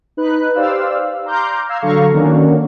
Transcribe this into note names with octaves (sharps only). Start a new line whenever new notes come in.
D#4 B4 F#6
G4 C5 D5 F5 E6
A#5 C6 D6 F6 G6
F5 A#5 E6 G#6 C7
D3 F#3 A4 F5 A#5 C#6
D#3 A#3 C#4 D4 F#4